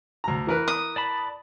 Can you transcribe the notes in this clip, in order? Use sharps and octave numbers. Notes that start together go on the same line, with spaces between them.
D2 A#5
E3 A#4 B4
D#6
D5 A5 B5